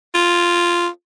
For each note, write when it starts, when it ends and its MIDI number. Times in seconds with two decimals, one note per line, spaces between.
0.15 0.88 65